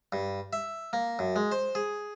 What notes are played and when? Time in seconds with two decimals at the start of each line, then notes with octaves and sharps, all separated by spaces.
0.13 G2
0.53 E5
0.93 A#3
1.19 F#2
1.36 G#3
1.52 C5
1.75 G#4